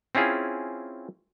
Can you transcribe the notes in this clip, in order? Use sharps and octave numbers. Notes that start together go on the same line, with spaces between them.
C4 C#4 E4 F4 G#4